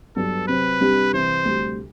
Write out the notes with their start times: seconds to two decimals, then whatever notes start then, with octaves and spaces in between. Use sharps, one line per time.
0.16 G2 F#3 B3 A4
0.48 C3 F#3 C4 G4 B4
0.80 C2 C3 G3 D4 G4
1.13 C2 C3 E3 C5
1.45 D2 C3 G3